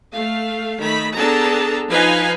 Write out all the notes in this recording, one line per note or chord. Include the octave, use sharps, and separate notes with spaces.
A3 F5
D#3 A3 B5
B3 D4 G#4 A4 A5 A#5
F3 D#4 B4 F5 G#5